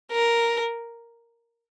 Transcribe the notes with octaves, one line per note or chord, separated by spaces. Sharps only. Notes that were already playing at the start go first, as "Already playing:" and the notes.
A#4